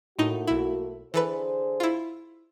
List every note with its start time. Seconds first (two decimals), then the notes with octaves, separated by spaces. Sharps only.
0.19 A2 A3 A#3 D#4 F#4
0.47 B1 E4
1.14 D3 E3 G#4 A4 B4 C5
1.80 E4 F4